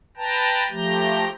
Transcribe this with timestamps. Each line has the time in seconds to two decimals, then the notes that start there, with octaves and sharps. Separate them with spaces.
0.17 B4 G5 A5 A#5
0.70 F3 A3 G4 A#5 G6